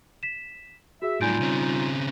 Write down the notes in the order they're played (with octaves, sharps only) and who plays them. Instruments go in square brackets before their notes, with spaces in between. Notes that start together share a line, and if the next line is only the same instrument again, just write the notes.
[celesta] B6 E7
[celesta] F#4 G#4 [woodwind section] E5
[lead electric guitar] A2 F#3 [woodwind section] G3 D#4 F4 [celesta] G#5 G6 D7
[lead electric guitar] C#3 C4